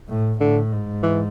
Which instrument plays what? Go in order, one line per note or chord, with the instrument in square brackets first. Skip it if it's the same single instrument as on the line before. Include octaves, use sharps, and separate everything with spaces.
[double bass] A2
[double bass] A2 [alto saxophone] D3
[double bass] G#2
[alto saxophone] E3